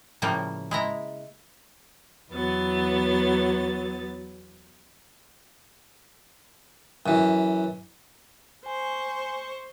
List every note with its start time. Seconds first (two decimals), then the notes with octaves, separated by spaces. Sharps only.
0.22 A2 C#3 F3 G3 A#3
0.71 G#3 E4 A#5
2.31 E2 F#3 B3 A6
7.06 F#2 E3
8.66 C5 G#5 C#6